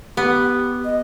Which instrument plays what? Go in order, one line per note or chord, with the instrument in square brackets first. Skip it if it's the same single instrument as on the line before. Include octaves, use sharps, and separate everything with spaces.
[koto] B3 [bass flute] G4
[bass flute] D#5